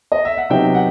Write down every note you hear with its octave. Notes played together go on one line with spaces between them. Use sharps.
D#5
E5
F#5
C3 F#3 B3 D#4 E5 G5
F#5